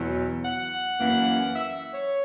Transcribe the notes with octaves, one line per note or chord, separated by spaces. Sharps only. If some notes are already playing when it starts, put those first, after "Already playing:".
Already playing: E2 B2 F#3
F#5
F#2 E3 A#3
E5
C#5